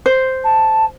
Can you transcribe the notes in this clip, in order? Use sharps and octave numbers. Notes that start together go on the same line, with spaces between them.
C5
A5